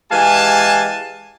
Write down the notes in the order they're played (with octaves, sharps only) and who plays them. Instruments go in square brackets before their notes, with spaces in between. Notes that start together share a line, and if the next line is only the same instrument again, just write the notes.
[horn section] E3 G#3 G4 F5 G#5 A5